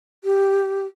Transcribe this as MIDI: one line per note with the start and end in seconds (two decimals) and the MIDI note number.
0.24 0.85 67